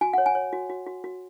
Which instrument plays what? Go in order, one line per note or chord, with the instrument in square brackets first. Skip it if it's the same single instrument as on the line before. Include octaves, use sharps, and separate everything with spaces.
[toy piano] F#4 G#5
C#5 F#5
G#5
C#5
F#4
F#4
F#4
F#4